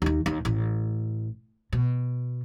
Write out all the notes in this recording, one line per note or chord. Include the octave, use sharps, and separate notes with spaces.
D#2 D#3
D#2
A1
B2